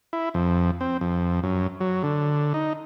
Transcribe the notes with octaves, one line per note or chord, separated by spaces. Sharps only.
E4
F2
C4
F2
F#2
F#3
D3
D#4